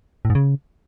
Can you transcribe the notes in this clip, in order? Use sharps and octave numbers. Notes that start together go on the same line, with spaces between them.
A2
G#2
C#3